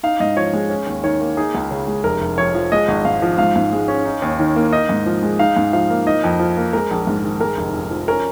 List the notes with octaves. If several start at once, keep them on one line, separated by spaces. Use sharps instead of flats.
D#4 F5
G#2 D#5
F3 C#5
G#3
C#4
D#2
D#3 C#5
A#3
D#4 G#4
C#2
C#3
G#3
F1 A#4
F1
F2 C#5
F3
G#3 D#5
G#1
G#2 F5
F3
G#2 F5
G#2
G#3
C#4
D#4
D#2
D#3
A#3
D#4 D#5
G#2
F3
G#3
D#4 F5
G#2
F3 F5
A#3
D#4 D#5
F2
F3
A#3
G#3 A#4
A#1
G#2
D#3
G#3 A#4
F1
F2
F3
C#4 A#4